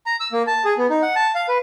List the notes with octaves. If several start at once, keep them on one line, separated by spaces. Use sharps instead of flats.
A#5
E6
A#3
A5
G#4
B3
D#4
F#5
A5
F5
B4